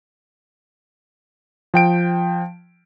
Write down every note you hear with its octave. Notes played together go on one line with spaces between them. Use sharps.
F3 G5 D7